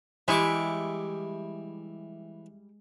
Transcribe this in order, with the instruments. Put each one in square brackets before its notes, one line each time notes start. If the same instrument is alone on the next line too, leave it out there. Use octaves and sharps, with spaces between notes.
[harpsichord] E3 C#6 D6 [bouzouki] G3 D5 [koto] G#3 E4